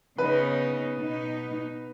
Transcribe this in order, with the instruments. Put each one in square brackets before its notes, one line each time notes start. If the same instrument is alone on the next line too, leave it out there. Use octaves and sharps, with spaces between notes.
[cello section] C#3 B3 D#4 [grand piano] B4
[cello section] B2 B3 D#4